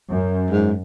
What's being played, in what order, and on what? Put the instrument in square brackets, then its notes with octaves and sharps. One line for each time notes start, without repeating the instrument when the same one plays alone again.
[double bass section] F#2
[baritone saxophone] G#2